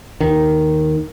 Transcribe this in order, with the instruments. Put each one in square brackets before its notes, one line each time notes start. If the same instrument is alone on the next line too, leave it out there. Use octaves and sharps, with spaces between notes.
[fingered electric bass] D#2 D#3